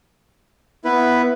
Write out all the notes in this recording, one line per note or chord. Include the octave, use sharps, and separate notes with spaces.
B3 E4 B4